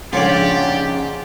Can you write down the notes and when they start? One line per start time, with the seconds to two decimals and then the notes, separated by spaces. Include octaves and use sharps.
0.13 A#1 G#2 C#3 F4 G4 C#5 D5